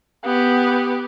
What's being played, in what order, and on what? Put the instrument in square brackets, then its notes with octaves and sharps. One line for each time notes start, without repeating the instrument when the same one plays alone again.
[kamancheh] B3 G4